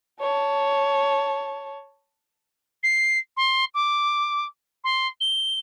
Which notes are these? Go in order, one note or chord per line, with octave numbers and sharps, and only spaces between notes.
C#5 A5
C7
C6
D6
C6
G7